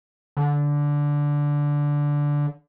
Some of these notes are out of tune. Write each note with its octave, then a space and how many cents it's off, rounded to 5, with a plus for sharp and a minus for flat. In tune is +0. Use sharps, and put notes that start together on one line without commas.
D3 -10